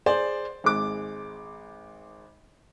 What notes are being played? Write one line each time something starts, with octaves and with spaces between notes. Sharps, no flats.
G#4 C5 D5
G#1 G#3 D6